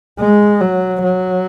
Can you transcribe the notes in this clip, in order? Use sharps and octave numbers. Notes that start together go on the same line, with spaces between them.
G#3
F#3
F#3